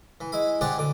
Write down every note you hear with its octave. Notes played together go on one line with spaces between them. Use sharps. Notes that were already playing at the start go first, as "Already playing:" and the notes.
E3
G#3 E4 B5
C4 D4 G4 G#4 D5 F#5
D2 D3 D6